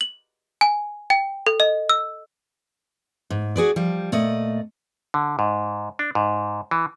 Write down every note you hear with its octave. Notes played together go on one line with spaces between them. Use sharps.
F#7
G#5
G5
A4
D#5
E6
G#2
F#4 G#4 B4 D5
F3 G3
A#2 A3 D5 D#5
D3
G#2
D4
G#2
E3